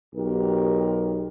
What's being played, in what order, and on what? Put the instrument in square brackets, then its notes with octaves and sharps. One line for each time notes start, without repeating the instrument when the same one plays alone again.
[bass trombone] B1 [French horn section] G4 A#4